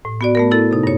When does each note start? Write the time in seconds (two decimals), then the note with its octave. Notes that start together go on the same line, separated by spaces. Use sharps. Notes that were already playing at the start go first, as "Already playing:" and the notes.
0.05 A2
0.21 B3 F#4 D5
0.35 A3 B3 A#4
0.51 E4 A4
0.71 C3 D#4
0.83 G2 C#5